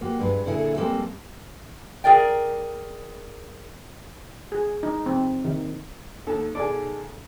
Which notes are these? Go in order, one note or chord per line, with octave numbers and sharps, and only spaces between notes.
G#3 A#3 F#4 G4
G2 G#3 B4
A#2 D3 E4 G#4 A4
G3 G#3 A#3 C4 A4
G#4 A#4 D5 G5
G#4
D#4
C4
D#3
D#2 D#3 A4
B1 D#3 G#4 A4 D5